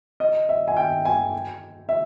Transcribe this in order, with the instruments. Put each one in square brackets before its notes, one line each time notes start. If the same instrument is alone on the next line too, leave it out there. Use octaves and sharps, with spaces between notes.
[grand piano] D#5
E5
G#5
G5
G#5
E5